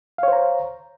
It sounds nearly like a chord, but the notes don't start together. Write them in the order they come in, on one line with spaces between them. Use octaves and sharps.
F5 C#5 C5 A#5